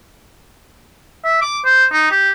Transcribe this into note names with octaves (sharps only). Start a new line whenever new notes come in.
E5
D6
C5
D#4
G4